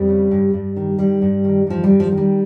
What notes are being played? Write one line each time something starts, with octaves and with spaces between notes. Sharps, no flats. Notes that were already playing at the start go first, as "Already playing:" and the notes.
Already playing: F2 G3
C#3
G2
G2
D#3
G2 G3
G2
D#3
G2 F3
G3
G2
F3
D#3
G3